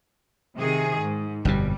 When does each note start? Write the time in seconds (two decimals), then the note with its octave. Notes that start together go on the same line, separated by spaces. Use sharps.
0.58 C3 D#3 G#4
1.01 G#2
1.45 G1 F2 B2 G3